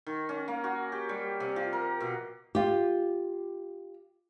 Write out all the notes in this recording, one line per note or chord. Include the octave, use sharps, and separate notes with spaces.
D#3
C#4
A#3
F#4
G4
G3
C3
F3
A#4
B2
F4 G4